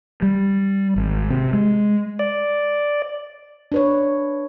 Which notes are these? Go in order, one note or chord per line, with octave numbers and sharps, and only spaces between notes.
G3
G#1
C3
G#3
D5
D4 B4 C#5